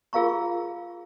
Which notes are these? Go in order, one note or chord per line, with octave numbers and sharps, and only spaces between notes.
F4 G#4 A#4 F5 A#5 C#6